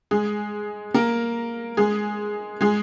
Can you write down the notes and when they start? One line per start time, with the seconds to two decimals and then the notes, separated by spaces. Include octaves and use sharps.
0.11 G#3 G#4
0.94 A#3 A#4
1.77 G#3 G#4
2.61 G#3 G#4